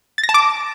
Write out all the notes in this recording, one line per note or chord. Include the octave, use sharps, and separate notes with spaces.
A6
A#6
A5
D6